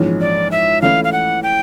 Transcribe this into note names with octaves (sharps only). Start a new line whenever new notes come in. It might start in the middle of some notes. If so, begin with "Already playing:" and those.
Already playing: A#1 G#2 E3 G#3 C#4
D5
E5
E3 A3 C#4 E4 F5
F5
F#5
G5